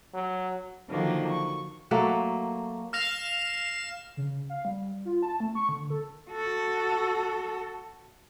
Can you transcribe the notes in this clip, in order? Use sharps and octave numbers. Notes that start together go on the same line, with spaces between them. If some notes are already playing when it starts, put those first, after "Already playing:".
F#3
D3 D#3 F3 F#3 A#3 D4
C#6
F#3 A3 A#3 F#4
F5 F6 A#6 E7 F7
C#3
F5
G3
F4
A5
A3
C#6
D3
A4
F#4 A4